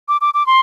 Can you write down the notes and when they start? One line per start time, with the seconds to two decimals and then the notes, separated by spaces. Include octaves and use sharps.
0.08 D6
0.21 D6
0.34 D6
0.47 C6